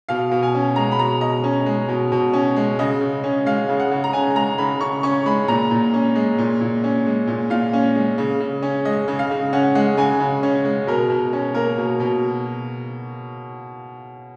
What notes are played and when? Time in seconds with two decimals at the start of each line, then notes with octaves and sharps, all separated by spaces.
0.09 B2 F5
0.31 B2
0.43 G#5
0.55 C#4
0.76 G#3 A#5
0.92 B5
0.99 B2 A#5
1.21 B2 D#5
1.44 C#4
1.66 G#3
1.89 B2
2.12 B2
2.33 C#4
2.56 G#3
2.79 C#3 D#5
3.01 C#3
3.24 C#4
3.46 G#3 F5
3.69 C#3
3.80 F#5
3.92 C#3
4.04 A#5
4.13 C#4 G#5
4.35 G#3 A#5
4.58 C#3 B5
4.81 C#3 C#6
5.03 C#4 C#6
5.26 G#3 B5
5.48 A#2 A#5
5.71 A#2
5.94 C#4
6.15 G#3
6.39 A#2
6.61 A#2
6.84 C#4
7.06 G#3
7.28 A#2
7.50 A#2 F5
7.73 C#4
7.95 G#3
8.18 C#3
8.40 C#3
8.63 C#4
8.85 G#3 D#5
9.08 C#3
9.19 F5
9.31 C#3
9.53 C#4 F#5
9.75 G#3 F#5
9.97 C#3 G#5
10.20 C#3
10.43 C#4
10.65 G#3
10.87 B2 A#4
11.10 B2
11.33 C#4
11.55 A#3 A#4
11.78 B2
12.00 B2